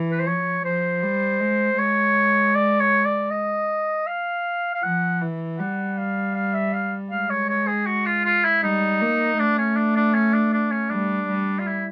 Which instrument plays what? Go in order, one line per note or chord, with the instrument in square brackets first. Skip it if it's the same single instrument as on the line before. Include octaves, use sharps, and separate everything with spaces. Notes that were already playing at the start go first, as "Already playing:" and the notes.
Already playing: [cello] E3
[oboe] B4
C5
[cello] F3 [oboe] C#5
[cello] F3 [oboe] C5
[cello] G3
G#3
[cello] G#3 [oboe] C#5
[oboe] D5
C#5
D5
D#5
F5
F5
[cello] F3 [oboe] F#5
[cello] E3
[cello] G3 [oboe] F#5
[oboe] F5
F5
E5
F5
[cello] G#3 [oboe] F5
[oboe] C#5
C#5
G#4
F#4
F4
F4
E4
[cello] G3 [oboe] D#4
[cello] A#3
[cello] A3 [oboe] D4
[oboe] C#4
D4
D4
C#4
D4
D4
C#4
[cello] G3 [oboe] D4
[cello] G3
[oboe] F4
E4